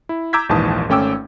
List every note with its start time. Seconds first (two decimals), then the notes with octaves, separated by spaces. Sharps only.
0.09 E4
0.33 A#5 D6 E6 G6 G#6 B6
0.49 A#1 D#2 G#2 E3 A5 D#6
0.89 G#1 A3 C#4 G5 D6 E6